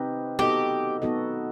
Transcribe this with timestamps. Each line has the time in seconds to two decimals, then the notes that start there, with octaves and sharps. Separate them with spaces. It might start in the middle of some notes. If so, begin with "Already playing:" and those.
Already playing: C4 D#4 G4 B4 D#5
0.39 B3 D#4 F#4 G4 A4 D#5
1.02 B3 D#4 F#4 A4 D#5